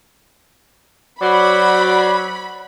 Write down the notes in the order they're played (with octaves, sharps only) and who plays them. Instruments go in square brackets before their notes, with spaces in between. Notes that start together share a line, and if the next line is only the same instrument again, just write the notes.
[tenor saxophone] F#3 [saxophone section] F#4 C5 D5 [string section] B5